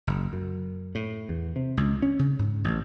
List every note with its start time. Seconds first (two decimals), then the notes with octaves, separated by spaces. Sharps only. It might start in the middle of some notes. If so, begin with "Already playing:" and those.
0.07 F#1
0.33 F#2
0.95 A2
1.29 E2
1.56 C3
1.77 C#2
2.02 C#4
2.19 C#3
2.39 G#2
2.64 A1